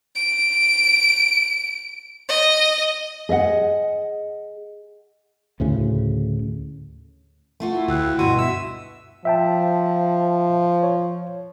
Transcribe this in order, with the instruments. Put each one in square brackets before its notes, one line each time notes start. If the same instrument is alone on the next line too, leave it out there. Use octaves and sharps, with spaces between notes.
[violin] D7
D#5
[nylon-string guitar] G#4 D#5 E5 F#5
[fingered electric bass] D2 A2 C#3
[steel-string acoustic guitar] A3 F4 F#4
[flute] E4
[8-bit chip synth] D2 [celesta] G5 E6 F#6
[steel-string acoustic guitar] G2 B2 [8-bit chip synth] F#4 [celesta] C6 D#7
[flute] E5 [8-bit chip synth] E6
[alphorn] F3 [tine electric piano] E5 G5 A5
[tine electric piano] C#5